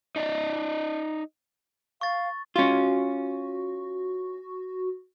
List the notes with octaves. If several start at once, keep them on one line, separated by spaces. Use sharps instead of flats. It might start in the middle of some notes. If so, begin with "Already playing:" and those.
D#4 D5 D#5
F5 C#6 A6
C#4 F4 F#4